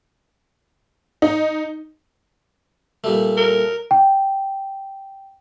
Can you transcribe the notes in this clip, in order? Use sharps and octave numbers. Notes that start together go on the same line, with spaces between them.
D#4
A#2 G3 A3
A#4
G5